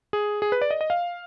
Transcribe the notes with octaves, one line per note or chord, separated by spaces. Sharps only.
G#4
G#4
B4
D5
D#5
D#5
F5